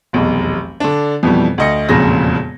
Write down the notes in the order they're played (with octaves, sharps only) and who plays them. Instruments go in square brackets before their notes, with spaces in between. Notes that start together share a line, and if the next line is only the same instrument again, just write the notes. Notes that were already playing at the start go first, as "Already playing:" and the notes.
[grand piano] F1 B1 E2
D3 D4
F2 B2 E3 G3
D2 D#5 C#7
E1 F2 A#2 C#3 A#6